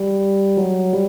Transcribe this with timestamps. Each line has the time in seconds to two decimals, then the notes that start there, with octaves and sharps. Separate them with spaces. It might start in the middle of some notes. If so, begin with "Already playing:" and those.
Already playing: G3
0.57 F#3
0.93 G3